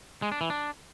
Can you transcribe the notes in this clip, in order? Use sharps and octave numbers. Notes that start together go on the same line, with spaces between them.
G#3
D4
E3
D4